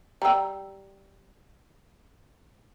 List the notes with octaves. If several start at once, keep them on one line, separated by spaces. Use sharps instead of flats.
G3 G5 A#5 E6